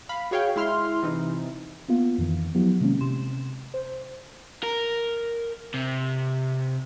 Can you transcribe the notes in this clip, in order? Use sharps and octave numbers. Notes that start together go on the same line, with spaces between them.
F5 B5
F#4 G#4 C#5 F5 G5
G#3 E4 C6 F6
C3 E3 D#4
A#3 B3 F4 F5
F2 D#3 E3
F3 F#3 B3 E4 G4
C3 D#3 G#3 A#3 C#4
C3 C6 E7
C5
A#4
C3